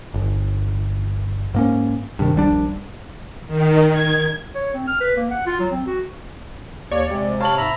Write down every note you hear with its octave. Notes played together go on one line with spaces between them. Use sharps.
G1
G#2 A#3 C#4
G2 C3 D#3
D#1 A#1 G3 D4
D#3
G#6
C#5
C4
F6
B4
A#3
F#5
F4
F#3
C4
F#4
D#2 C#5 D5
C3 G#3
C#5 F5 A5 F#7
G#2 E5 A#5 B5